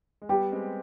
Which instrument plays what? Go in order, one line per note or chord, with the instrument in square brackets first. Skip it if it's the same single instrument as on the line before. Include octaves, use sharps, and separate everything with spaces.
[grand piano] G#3
[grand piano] G3 B3 [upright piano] G4
[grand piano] G#3 C4